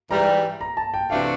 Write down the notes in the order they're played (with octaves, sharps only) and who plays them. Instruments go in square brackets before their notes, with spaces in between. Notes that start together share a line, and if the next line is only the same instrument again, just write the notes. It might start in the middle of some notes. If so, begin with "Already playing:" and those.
[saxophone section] G#2 E3 G3 [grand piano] A#5
[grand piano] A#5
A5
G5
[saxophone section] C3 E3 A3 D4 F#4 [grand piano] F5